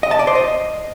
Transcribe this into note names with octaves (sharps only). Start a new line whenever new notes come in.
D#5
A5
D5
C5
D#5